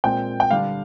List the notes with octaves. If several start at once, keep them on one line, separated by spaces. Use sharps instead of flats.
A#2 G#3 C4 G5
G5
D3 G3 D4 F5